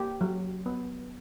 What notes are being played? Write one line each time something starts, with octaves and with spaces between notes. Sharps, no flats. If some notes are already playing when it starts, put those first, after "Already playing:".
Already playing: A#3 G4
F#3
B3